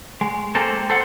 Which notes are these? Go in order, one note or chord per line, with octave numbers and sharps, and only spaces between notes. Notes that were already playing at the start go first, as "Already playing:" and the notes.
G#3
G#3 A#3 C4 A4
A4 C5 F#5